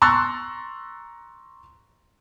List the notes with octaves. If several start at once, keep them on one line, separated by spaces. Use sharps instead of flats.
A#5 C6 C#6 E6 F#6 A6